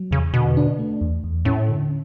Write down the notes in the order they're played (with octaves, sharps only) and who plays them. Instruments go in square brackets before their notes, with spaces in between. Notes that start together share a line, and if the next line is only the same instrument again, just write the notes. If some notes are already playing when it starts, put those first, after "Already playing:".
Already playing: [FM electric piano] F#3
[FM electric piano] E2 [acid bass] C#3
[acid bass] B2 [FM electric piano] D3
[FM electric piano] D4
A3
E2
E2
[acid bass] A2 [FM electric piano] C#4
[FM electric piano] D3